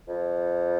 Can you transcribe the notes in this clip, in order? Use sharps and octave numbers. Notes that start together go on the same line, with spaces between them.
F2